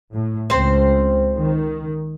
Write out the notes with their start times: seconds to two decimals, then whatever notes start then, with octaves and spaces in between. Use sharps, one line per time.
0.13 A2
0.50 C#2 C#3 C4 C5
1.37 D#3